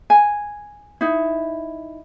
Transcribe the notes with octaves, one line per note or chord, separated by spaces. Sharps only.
G#5
D#4 E4